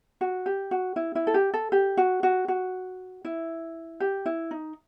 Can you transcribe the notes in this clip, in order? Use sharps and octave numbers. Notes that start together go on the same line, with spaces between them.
F#4
G4
F#4
E4
E4
A4
G4
A4
G4
F#4
F#4
F#4
E4
G4
E4
D#4